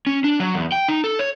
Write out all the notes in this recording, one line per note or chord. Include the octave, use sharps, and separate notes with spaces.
C#4
D4
F#3
E2
G5
D#4
A4
C#5